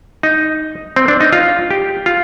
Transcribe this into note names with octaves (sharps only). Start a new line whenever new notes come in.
D#4
C4
D4
D#4
F4
G4
F4